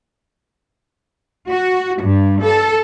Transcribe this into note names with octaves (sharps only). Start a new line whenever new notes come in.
F#4
G2
A4